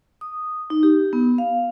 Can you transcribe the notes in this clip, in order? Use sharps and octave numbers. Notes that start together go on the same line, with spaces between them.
D#6
D#4
G4
B3
F5